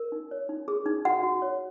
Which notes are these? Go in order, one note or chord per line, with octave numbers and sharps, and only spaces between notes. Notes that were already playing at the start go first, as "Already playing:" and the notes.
Already playing: A#4
D#4
C#5
D#4
G#4
D#4
F#4 F#5
F#4
C#5